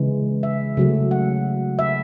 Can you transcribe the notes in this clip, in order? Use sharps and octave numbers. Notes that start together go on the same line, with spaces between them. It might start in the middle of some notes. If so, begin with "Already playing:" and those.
Already playing: C#3 E3 G#3
E5
C#3 F#3 A3
F#5
E5